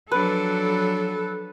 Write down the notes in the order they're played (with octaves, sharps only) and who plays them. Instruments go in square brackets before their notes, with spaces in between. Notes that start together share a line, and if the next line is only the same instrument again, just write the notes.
[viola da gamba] F3 F#3 D4 [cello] A4 [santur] B4